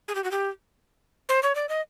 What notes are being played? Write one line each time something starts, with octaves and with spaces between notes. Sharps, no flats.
G#4
G4
F#4
G4
C5
C#5
D5
D#5